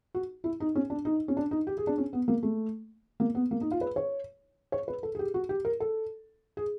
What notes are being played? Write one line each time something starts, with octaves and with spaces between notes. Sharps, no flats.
F#4
E4
D#4
C#4
D4
D#4
C#4
D4
D#4
G4
G#4
D4
C#4
B3
A#3
A3
A#3
B3
A#3
D#4
F4
B4
C#5
C#5
B4
A4
G#4
G4
F#4
G4
A#4
A4
G#4